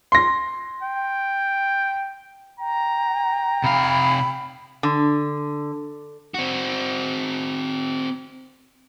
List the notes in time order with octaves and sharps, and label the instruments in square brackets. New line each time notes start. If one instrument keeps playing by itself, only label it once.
[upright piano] C6 A#6
[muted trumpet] G5
[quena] G5 [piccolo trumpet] A#5
[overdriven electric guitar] C3 F5 [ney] B5
[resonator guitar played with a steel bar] D3
[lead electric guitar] C4 F#4